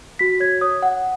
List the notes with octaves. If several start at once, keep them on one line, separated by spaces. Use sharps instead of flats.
F#4 B6
C#5 G#6
C#5 D#6
C#5 F#5